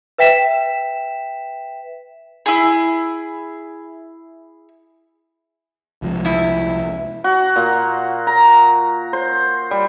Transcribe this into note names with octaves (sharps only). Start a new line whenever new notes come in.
B4 E5 G5 B6 E7
E4 G#4
C2 F3 G#3
E2 E4
F#4
A#2
A#5
C5
G3